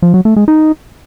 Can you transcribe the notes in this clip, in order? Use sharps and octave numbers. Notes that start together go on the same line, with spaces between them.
F3
F#3
A3
G#3
D#4